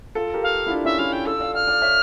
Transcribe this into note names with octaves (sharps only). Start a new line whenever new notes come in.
F4 A4
G4 A#4
F5
E4
D4 F4
C#4 E4 E5
C#4 E4 F5
G5
F4 A4 E6
D5 F5
D5 F5 F6
D5 F5
C#5 E5